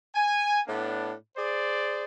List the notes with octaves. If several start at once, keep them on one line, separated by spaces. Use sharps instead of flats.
G#5
A2 B3 D4
G#4 C5 D5